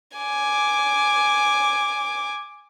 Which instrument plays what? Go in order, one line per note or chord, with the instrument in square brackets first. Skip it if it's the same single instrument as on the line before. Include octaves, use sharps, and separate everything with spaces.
[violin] G#5 D6